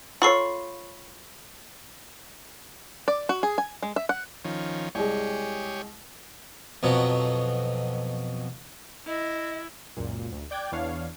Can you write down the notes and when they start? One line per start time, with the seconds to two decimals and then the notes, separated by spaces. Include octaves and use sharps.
0.22 F4 A4 C#5 B5 C#6 C7
3.08 D5
3.29 F#4
3.43 G#4
3.58 G#5
3.82 G#3
3.96 E5
4.09 F#5
4.45 D#3 F3 C#4
4.95 C2 G#3 G4 G#4 C#5
6.83 F2 B2 F#3
9.06 E4 D#5
9.97 C#2 F#2 A#2
10.32 D2
10.51 D5 G5 D6 F#6 G#6
10.72 E2 E3 B3 D4 C#5 F5